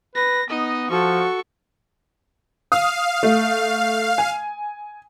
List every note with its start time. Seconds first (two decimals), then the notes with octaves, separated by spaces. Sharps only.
0.15 B4 A#6
0.49 B3 D#4 D#5
0.90 F3 F#4 A4 C#6
2.72 F5 D#6
3.23 A3
4.18 G#5